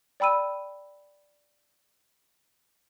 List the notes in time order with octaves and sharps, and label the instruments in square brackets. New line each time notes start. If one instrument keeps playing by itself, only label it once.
[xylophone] D5 G5 B5 E6 D#7